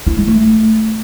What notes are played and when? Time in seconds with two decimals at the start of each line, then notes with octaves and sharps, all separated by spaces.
0.07 E4
0.17 G#3
0.28 A3